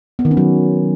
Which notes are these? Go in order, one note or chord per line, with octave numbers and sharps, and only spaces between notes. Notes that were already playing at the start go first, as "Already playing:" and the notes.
B3
D#3
C#4
F#3